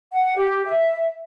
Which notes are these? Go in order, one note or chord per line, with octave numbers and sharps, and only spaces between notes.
F#5
G4
E5